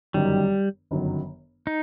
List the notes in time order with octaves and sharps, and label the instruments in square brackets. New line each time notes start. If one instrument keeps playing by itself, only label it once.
[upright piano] G1 F#2 D#3 F#3 [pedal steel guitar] G3
[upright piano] G1 F#2 D#3 F#3
[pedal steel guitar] D#4